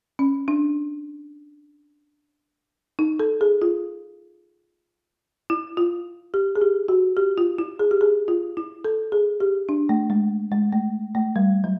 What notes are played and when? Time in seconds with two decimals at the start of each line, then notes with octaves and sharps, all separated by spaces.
0.19 C#4
0.48 D4
2.99 D#4
3.20 A4
3.41 G#4
3.62 F4
5.50 E4
5.77 F4
6.34 G4
6.56 G#4
6.61 G4
6.88 F#4
7.17 G4
7.38 F4
7.58 E4
7.79 G#4
7.91 G4
8.01 G#4
8.28 F4
8.57 E4
8.85 A4
9.12 G#4
9.40 G4
9.69 D4
9.89 A3
10.10 G#3
10.52 G#3
10.73 A3
11.15 A3
11.36 G3
11.64 F#3